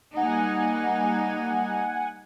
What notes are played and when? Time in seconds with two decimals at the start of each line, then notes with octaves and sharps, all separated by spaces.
0.17 G3 A#3 D#4 F#5 G#5